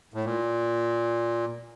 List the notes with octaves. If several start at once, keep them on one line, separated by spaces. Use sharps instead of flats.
A2
A#2